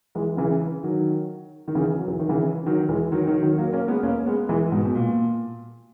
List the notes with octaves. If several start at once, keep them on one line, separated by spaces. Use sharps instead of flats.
E3 G#3
C#3 E3
D#3 F#3
D#3
C#3 E3
F#3
E3
D#3
C#3 E3
D#3 F#3
E3 G#3
D#3 F#3
D#3 F#3
D#3 F#3
F#3 A#3
A#3 C#4
G#3 B3
A#3 C#4
G#3 B3
E3 G#3
G#2 B2
B2
A#2